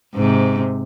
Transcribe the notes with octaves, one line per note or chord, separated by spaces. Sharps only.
G#2 C3